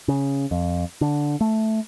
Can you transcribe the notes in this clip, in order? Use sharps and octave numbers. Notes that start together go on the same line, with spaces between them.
C#3
F2
D3
A3